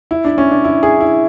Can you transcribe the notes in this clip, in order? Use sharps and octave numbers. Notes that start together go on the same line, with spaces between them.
E4
D4
C#4
D4
E4
G#4
E4